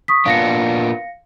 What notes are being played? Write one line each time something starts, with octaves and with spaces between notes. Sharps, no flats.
C#6 D#6 B6
A#2 B3 D4 F5 A#6 C#7